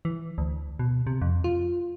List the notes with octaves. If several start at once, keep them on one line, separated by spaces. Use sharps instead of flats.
E3
D2
B2
C3
F2
F4